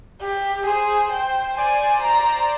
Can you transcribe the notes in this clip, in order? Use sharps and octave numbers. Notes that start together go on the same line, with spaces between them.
G4
G#4 C5
G5
D5 G#5
A#5